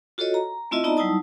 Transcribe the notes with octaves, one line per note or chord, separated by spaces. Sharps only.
F4 F#4 A4 C#5 D#5
A#5
A3 C4 E4 F4 D#5 E5
B3 D#4 D5 D#5 A5 A#5
F#3 G3 D#4 E4 A5 D#6